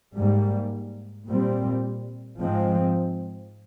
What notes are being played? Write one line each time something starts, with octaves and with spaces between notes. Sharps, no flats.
G#2 G3 A#3
A#2 G3 C4
G#2 F3 G#3 C4